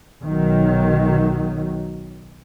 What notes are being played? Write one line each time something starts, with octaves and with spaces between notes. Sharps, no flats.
B1 D#3 F#3